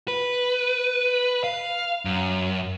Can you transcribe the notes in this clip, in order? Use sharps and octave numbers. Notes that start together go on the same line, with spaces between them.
B4
F5
F#2